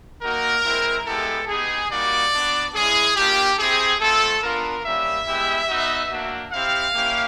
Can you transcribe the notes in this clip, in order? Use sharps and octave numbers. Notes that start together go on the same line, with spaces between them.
A#3 D#4 F#4 A#4
G#3 C4 E4
G#3 B3 E4 G4 A4
B3 D#4 G4 G#4
G3 A#3 D#4 F#4 D5
B3 D4 F#4
G#3 C#4 E4 G#4
A#3 D4 F4 G4
C4 E4 G4 G#4
A3 C4 F4 A4
B3 D4 F4 A#4
G3 A#3 C#4 E5
G#3 B3 E4 G4
B3 D#4 F#4
A#3 D4 F#4
C4 E4 G4 F5
A#3 C#4 E4 G4